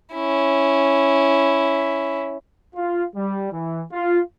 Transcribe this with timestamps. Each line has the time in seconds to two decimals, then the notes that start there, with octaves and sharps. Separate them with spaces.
0.14 C#4 E4
2.75 F4
3.15 G3
3.52 E3
3.92 F4